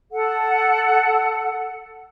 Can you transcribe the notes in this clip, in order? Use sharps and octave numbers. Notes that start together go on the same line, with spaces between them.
A4 F#5